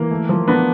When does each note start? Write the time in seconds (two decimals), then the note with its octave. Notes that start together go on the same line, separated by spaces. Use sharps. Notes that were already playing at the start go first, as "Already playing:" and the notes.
Already playing: E3 A#3
0.11 A3
0.29 F3
0.48 B3 D4